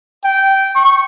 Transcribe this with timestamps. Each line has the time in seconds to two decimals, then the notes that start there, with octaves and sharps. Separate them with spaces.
0.24 G5
0.76 C#6